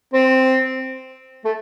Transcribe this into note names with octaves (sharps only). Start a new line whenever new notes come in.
C4
A3